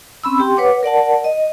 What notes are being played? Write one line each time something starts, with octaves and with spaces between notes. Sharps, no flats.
C4 C#4 B5 E6
G4 G5 C6
B4 C#5 F#5 D6
A#4 D5 F#5 A5
D#5